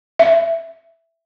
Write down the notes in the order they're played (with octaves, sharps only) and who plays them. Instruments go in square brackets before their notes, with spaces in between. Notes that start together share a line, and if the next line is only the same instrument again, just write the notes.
[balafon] E5